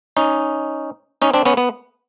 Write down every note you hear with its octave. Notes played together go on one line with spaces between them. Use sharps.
C#4 D#4
C#4 D#4
C4 D4
B3 C#4
B3